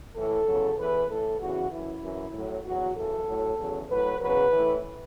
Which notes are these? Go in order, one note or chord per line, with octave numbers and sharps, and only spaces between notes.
A2 E3 A4
E2 C#3 F#3
E2 E3 B4
A2 E3 A4
E2 C#3 E3 F#4
F#2 E3 E4
F#2 E3
A2 F#3
E2 B2 F#3 F#4
F#2 C#3 E3 A4
A2 F#3
E2 C#3 F#3
A2 F#3 B4
E2 C#3 F#3 B4
A2 E3